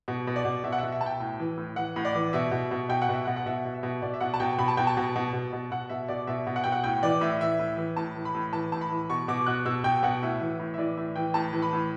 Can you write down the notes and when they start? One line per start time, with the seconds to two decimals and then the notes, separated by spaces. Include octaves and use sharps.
0.08 B2
0.27 B2
0.36 D5
0.45 B2
0.64 B2 E5
0.72 F#5
0.78 B2 E5
0.92 E5
1.01 B2 A5
1.06 G5
1.20 A2
1.40 E3
1.57 A2
1.76 E3 F#5
1.96 A2
2.05 D5
2.15 E3
2.33 B2 E5
2.51 B2
2.71 B2
2.89 B2 G5
3.02 F#5
3.09 B2 E5
3.25 B2 F#5
3.36 F#5
3.46 B2 E5
3.65 B2
3.74 E5
3.83 B2
4.02 B2 D5
4.14 E5
4.20 B2 F#5
4.34 A5
4.40 B2 G5
4.58 B2 B5
4.68 A5
4.77 B2 G5
4.87 A5
4.97 B2
5.16 B2
5.33 B2
5.53 B2
5.71 B2 F#5
5.89 B2 E5
6.08 B2 D5
6.27 B2 E5
6.47 B2
6.56 F#5
6.64 B2 G5
6.72 F#5
6.84 A2 G5
7.03 E3 D5
7.21 A2 E5
7.41 E3 E5
7.59 A2
7.77 E3
7.96 A2 A5
8.16 E3
8.25 B5
8.35 A2
8.53 E3 A5
8.72 A2 A5
8.81 B5
8.91 E3
9.10 B2 C#6
9.28 B2 D6
9.46 B2 F#6
9.65 B2 E6
9.84 B2 G5
10.03 B2 F#5
10.22 A2 E5
10.41 E3
10.59 A2
10.74 E5
10.78 E3 D5
10.97 A2 E5
11.16 E3 G5
11.34 A2 A5
11.53 E3
11.62 B5
11.73 A2